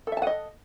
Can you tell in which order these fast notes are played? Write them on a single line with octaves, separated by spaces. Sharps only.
A4 E5 A5 F#5 D#5